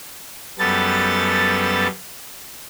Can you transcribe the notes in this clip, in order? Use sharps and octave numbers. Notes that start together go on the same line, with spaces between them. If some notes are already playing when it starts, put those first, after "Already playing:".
F#2 G3 B3 A4 A6